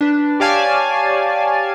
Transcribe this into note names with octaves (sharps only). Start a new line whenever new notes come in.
D4 B4
G4 C#5 D5 F5 G#5 A5